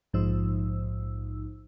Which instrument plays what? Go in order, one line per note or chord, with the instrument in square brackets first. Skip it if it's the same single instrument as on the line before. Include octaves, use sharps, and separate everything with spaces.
[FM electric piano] A#1 G#2 F3 D#4 C5 E6